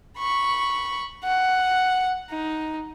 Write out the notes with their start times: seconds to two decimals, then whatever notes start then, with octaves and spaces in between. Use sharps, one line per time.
0.18 B5 C#6
1.24 F#5
2.31 D#4